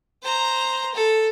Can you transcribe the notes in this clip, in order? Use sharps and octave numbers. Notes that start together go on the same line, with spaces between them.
C5 A#5
A4